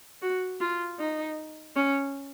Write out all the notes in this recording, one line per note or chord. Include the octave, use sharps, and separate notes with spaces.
F#4
F4
D#4
C#4